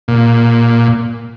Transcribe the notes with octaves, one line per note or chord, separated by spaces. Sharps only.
A#2